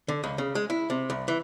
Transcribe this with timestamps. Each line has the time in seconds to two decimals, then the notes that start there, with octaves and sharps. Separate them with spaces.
0.08 D3
0.24 C#2
0.38 C#3
0.55 G#3
0.70 E4
0.90 C3
1.10 C2
1.28 E3